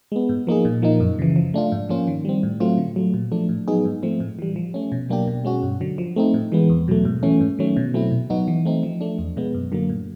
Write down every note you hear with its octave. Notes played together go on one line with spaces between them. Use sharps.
G#3 B3
G#2
F3 A#3 D#4 G#4
A#2
F3 A#3 D#4
F#2
C#3 E3
F3
A3 D4 F4
G#2
F3 A#3 C#4 F4
D#3
G3 C4
A2
F#3 A3 C4 F4
D3
F#3 A3
A#2
F3 A3 D4
A2
F#3 B3 D#4 G#4
G#2
F3 A3 C4
A2
E3 G3
F3
A3 C#4
B2
F#3 A#3 D4 G4
B2
G#3 C#4 F#4
G2
D3 F#3
F3
A3 C4 D#4
A2
E3 G#3 B3
E2
B2 F#3 A3
G#2
E3 A3 C#4
G#2
D#3 F#3 A3 C#4
B2
F#3 A3 C4 E4
B2
F#3 B3 D#4 F#4
E3
A3 C4 D#4
F3
A3 D4
E2
B2 G#3 B3
F#2
D3 F#3 A#3
A2